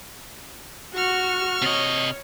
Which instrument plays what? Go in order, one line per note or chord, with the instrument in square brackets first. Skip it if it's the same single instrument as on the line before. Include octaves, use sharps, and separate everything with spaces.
[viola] F#4 [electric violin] C#6 F6
[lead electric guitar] C3 D#5 [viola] C#5